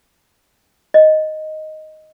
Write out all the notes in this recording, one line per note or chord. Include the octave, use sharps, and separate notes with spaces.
D#5